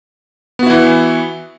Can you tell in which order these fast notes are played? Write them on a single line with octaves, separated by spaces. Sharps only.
B3 F#4 E4 E3